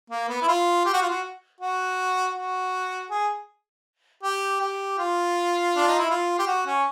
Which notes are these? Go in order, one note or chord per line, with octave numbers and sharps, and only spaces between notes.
A#3
B3
E4
F4
G4
F#4
F4
F#4
F#4
F#4
G#4
G4
G4
F4
D4
D#4
E4
F4
G4
F#4
C#4